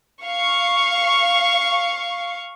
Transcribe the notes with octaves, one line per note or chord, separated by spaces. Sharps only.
F5 C#6